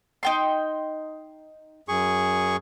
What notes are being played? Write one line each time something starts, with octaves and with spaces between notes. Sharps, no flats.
D#4 G5 C6
F#2 G#4 C#6